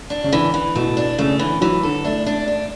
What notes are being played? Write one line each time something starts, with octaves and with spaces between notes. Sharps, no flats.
D4
C#3
D3 E3
E3
B2 A3
D4
C#3 A3
D3 E3
E3 F#3
D3 A4
A3 D4
D4
D4